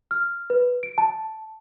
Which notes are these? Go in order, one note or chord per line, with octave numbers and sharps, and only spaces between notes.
F6
B4
D7
A5